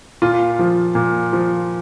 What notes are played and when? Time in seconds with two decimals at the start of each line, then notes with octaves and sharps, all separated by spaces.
0.22 A#2 F4
0.59 F3
0.95 A#2
1.33 F3